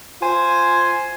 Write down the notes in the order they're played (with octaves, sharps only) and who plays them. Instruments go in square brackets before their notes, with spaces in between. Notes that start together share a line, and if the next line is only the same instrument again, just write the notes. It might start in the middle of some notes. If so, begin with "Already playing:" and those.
[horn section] F4 C5 G#5